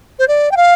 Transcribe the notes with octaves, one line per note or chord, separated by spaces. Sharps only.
C5
D5
G5
F5